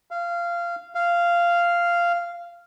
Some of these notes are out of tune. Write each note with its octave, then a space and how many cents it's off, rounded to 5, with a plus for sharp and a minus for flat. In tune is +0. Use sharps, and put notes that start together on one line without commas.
F5 -20
F5 -10